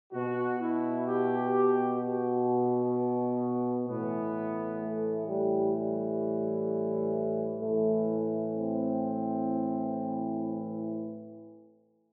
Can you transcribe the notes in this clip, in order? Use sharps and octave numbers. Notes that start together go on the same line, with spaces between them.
B2 F#4
E4
G4
F#4
A2 E3 B3
A3
G3
G3
A2 E3 A3
C4